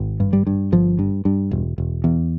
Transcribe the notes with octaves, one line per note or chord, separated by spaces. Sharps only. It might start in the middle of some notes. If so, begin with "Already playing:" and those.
Already playing: G#1
G2
G3
G2
G1 F3
G2
G2
E1
E1
E2